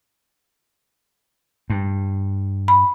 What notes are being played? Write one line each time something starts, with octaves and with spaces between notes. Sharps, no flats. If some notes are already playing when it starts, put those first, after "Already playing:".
G2
B5